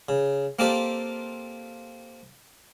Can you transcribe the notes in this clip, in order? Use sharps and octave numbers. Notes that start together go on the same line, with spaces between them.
C#3
A#3 C4 F4 G4 A4 D5